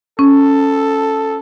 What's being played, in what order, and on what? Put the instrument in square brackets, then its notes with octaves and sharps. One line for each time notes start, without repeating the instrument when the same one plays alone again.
[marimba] C#4 [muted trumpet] A4